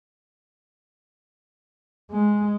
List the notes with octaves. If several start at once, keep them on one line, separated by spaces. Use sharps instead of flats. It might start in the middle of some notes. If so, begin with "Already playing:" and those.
G#3